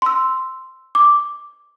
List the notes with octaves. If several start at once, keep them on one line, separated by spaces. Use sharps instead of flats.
C6 E6
D6